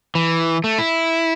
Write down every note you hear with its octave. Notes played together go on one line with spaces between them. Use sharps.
E3
A3
E4